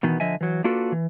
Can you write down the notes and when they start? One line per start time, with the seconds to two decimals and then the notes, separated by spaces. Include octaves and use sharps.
0.03 B2 D#3 E3 B3
0.20 D3 F3 D#5 E5 G#5
0.41 E3 F#3
0.64 A#3 D4 F4 F#4 A4 B4
0.92 E3